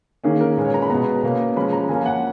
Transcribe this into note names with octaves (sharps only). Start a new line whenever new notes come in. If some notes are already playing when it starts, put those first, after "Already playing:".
D#3 A#3 C#4 G#4
A#4
A#2 G#3 C#4 B4
C#5
A#5
B5
B2 G#3 B3 A#5
B2 A#3 C#4
F3 G#3 C#4 B5
A#5
F3 A#3 C#4 G#5
F#5